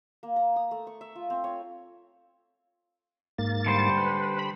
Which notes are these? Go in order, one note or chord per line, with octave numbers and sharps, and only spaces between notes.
A#3
A#5
D#6
A3
C#6
E5
F4
C4
C#5
G#2 A#3 A6
D3 G3 C5
B4
B5